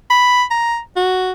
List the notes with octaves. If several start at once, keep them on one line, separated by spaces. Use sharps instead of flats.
B5
A#5
F#4